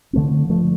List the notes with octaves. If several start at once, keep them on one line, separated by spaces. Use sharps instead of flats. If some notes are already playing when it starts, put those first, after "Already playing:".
D3 A3 C4
G2 F3 A3